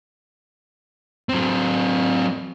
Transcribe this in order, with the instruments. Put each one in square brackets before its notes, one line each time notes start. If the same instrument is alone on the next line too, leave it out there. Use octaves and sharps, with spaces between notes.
[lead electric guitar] F#3 C4